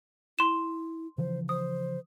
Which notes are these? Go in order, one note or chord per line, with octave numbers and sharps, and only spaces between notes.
E4 C6 E7
C#3 E3 F3 C5
C5 D#6